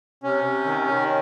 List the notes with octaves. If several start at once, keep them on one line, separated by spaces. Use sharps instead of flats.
C3 C#4
C3
D#3
D#3